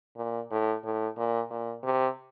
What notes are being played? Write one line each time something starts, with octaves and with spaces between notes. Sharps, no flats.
A#2
A2
A2
A#2
A#2
C3